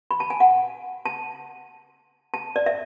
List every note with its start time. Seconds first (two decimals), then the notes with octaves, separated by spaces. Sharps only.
0.11 B5
0.20 A5
0.30 G#5
0.40 F#5
1.06 A5
2.34 A5
2.56 D5
2.66 E5